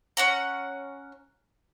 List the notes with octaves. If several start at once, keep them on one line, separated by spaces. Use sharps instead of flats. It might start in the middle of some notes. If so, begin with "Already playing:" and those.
C#4 F#5 A#5